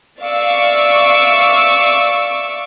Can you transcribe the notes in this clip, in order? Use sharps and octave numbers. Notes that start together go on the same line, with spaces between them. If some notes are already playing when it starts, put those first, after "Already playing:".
D5 E5 F5 C#6 D6 E6